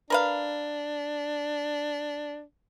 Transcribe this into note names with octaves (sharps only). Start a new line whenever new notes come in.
D4 A#4 B4 F5